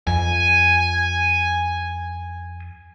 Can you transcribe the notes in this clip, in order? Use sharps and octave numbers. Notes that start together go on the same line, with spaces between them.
F2 G#5